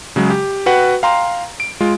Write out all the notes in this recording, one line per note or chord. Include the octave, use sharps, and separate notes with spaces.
C#3 F#3 G#3
G4
F#4 B4 F#5 G5
F5 G5 A#5 C6
D7
G#3 F4